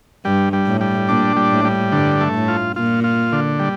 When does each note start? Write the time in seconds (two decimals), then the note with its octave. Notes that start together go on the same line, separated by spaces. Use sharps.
0.25 G2 G3
0.53 G3
0.67 A2
0.81 G3
1.09 A#2 D4
1.36 G3
1.51 A2
1.65 G3
1.92 G2 D3
2.20 A3
2.35 A2
2.48 F4
2.76 A#2 F4
3.04 F4
3.32 D3
3.59 G3